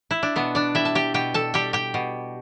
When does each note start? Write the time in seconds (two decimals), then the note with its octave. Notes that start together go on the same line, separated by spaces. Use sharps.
0.11 E4
0.23 D4
0.36 B2 B3
0.55 D4 D5
0.75 G3 E4 E5
0.85 A5
0.95 G4 G5
1.14 B2 G4 G5
1.34 A4 A5
1.54 G3 G4 G5
1.73 G4 G5
1.94 B2